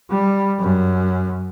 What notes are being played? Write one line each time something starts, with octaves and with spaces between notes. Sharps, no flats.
G3
F#2